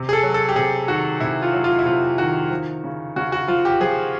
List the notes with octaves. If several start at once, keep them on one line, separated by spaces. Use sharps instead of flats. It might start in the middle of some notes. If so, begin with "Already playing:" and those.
Already playing: C3
G#4
A4
F#3
A4
G4
C3 G#4
D#3 F#4
C3 E4
F4
F#3
F4
E4
C3 F4
D#3 F#4
F3
C#3
C#3 F#4
F#4
F3 F4
G4
F3 G#4